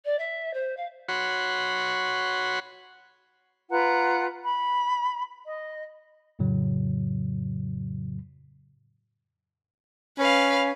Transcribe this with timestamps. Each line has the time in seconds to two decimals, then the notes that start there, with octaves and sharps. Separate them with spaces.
0.05 D5
0.18 E5
0.53 C5
0.76 F5
1.09 F#4 C#5 F#5 B5 C6
3.70 F4 B4 F#5 A#5
4.44 B5
5.44 D#5
6.39 F2 A2 C#3 F#3
10.18 C#4 B4 F5